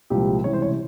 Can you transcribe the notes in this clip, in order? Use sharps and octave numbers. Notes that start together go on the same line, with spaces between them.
C2 A#2 F3 G#3 G4
C#2 C3 E3 G3 C#5
C5
C#5